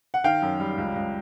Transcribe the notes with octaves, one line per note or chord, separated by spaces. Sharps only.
F#5
D#3 F5 G5
F#2
G3
C#2
C#2